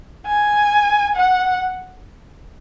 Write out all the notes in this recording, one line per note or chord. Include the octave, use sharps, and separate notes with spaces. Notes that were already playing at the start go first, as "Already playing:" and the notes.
G#5
F#5